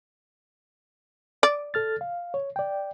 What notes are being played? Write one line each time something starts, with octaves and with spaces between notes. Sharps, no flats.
D5
A4 F6 A6
F5
C#5
D5 G5